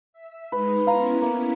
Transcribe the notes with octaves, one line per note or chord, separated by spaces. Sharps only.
E5
G#3 D#4 B4
B3 C#4 E4 F5 A#5 C6
A#3